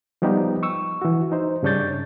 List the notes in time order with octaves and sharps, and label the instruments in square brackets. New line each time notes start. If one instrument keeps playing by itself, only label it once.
[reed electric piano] F3 G3 B3 D#4 G4
C#6 E6
E3 F#4
D#4 C5
G2 C#3 D4 C#5 G6 A6